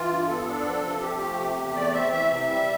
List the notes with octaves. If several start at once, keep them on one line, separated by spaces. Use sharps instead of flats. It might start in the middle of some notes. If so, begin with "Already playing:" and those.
Already playing: E3 F4
G2
B3 A4
D4
F3
C3
F3 G4
A3
C3
E2
A3 D5
C4 E5
E3 E5
C3
G3